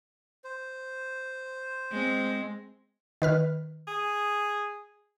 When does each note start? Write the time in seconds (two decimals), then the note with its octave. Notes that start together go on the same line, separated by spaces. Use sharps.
0.44 C5
1.92 G#3 C4
3.22 D#3 B4 F6
3.88 G#4